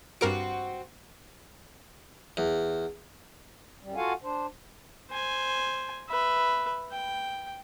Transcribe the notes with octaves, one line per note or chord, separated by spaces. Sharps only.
G2 C4 F#4 A#4 D7
E2
F#2 G3
F4 F#4 A4 F5 F#5 G#5
D4 C5
C5 G#5
B4 E5
G5